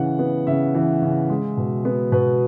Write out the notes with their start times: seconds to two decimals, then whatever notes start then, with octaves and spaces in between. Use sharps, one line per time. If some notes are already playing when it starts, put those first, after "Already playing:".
Already playing: C#3 E3 F#5
0.19 B3
0.47 C#3 E5
0.75 E3
1.02 C#3
1.30 G#3
1.57 B2
1.85 B3
2.12 B2 B4